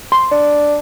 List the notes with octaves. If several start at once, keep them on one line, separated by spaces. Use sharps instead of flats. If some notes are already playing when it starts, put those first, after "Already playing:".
C6
D4